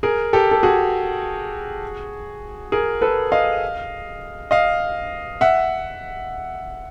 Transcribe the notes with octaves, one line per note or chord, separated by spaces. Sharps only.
G#4 A#4
G4 A4
A4
F#4 G#4
G#4 A#4
A4 B4
D#5 F5
D#5 F5
E5 F#5